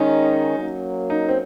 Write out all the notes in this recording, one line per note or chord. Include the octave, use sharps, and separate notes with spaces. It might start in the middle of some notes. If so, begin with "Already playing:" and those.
Already playing: D#3 G#3 C#4 D#4
F#3 A#3 C#4
D#4
C4